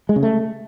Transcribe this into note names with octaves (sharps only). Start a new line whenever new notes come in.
G#3
C#3
A3